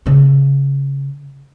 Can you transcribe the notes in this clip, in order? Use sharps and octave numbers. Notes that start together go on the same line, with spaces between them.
C#3 C#4